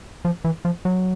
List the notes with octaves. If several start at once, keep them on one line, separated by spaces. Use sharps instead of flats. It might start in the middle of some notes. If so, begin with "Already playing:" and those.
F3
E3
F3
F#3